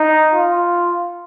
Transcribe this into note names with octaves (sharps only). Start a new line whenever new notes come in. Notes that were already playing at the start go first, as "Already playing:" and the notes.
Already playing: D#4
F4